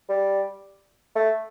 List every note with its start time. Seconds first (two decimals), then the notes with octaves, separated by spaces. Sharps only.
0.09 G3
1.15 A3